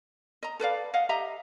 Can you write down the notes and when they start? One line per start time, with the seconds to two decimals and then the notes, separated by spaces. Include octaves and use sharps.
0.43 D#5 A#5
0.60 A4 B4 D5 F5
0.94 D#5 F5 F#5
1.09 G4 D#5 E5 A#5